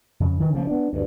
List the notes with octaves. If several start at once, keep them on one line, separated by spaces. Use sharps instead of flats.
F2 C#3
D#3 E3
C#3 F3 A#3
B3 D4
D2 G2